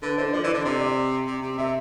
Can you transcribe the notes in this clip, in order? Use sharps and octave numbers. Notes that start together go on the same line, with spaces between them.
D3 B4
D3 C5
F3 D5
E3 C5
D3 D5
C3 D5
D5
C3
C3
C3 E5